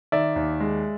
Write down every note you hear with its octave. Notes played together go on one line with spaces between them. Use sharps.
D#3 D5 E5
D#2
G#3